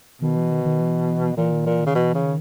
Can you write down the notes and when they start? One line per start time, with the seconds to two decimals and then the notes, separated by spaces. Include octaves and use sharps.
0.22 B2 D#3
0.36 E3
0.51 D#3
0.65 D#3
0.79 E3
1.37 A#2 E3
1.51 D#3
1.66 A#2 E3
1.80 D#3
1.87 C#3
1.95 B2 E3
2.14 C#3
2.24 D#3